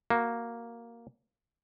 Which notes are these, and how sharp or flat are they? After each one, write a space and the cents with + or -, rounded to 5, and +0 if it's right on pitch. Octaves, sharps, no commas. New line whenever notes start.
A#3 +0 F#4 +0